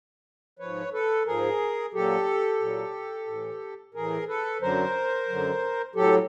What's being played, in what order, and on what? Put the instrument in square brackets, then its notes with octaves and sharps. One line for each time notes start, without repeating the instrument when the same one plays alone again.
[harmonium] G#2 F3 B4 C#5
A4 B4
G#2 F3 G#4 A#4
A#2 F#3 G4 A4
A#2 F#3
A2 E3
A2 E3 G#4 A#4
A4 B4
F#2 D3 F#3 A#4 C5
F#2 D3 F#3
A2 F#3 G4 A4